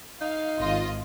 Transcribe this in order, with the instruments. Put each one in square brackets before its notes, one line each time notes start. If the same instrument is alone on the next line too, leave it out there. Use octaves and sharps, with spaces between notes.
[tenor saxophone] D#4 [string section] F5
[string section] G#1 F4 D#5